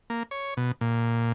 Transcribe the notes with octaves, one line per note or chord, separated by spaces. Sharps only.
A#3
C#5
B2
A#2